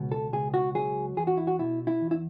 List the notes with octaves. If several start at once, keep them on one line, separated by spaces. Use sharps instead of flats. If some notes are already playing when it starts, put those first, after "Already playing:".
Already playing: C#2 B2
A4
C#2 G#4
F#4
F#3 G#4
E2 G#4
F#4
E4
F#4
B2 E4
E4
E2
E4